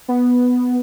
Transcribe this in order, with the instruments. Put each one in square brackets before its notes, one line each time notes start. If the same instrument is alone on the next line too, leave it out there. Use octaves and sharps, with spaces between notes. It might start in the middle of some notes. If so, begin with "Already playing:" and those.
[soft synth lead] B3